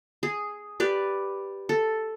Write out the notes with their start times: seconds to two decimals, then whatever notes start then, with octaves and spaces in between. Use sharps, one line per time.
0.23 G#4
0.80 G4 B4 D5
1.69 A4